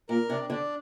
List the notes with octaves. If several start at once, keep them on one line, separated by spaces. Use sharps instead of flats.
A#2 A#4
C3 D4
D3 D4